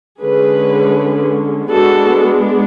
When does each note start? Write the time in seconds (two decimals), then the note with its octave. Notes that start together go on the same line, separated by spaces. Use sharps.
0.20 D3 G#3 C#4 G#4 B4
1.71 G#3 B3 D4 F#4 A4